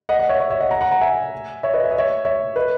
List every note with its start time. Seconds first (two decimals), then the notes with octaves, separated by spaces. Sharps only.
0.09 D#5 F#5
0.19 D#5 F#5
0.29 C#5 E5
0.40 C#5 E5
0.50 C#5 E5
0.61 D#5 F#5
0.71 F#5 A#5
0.81 F#5 A#5
0.91 F#5 A#5
1.01 E5 G#5
1.63 C#5 E5
1.74 B4 D#5
1.84 E5
1.91 D#5
1.98 C#5 E5
2.25 C#5 E5
2.56 B4 D#5